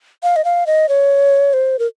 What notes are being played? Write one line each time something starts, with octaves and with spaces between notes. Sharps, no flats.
F5
D#5
F5
D#5
C#5
C5
A#4